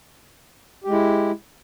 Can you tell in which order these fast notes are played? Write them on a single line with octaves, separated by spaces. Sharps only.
G4 G#3 E4